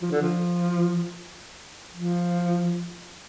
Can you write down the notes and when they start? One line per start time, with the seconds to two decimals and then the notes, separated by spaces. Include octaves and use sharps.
0.02 F3
0.11 D3
0.21 F3
1.93 F3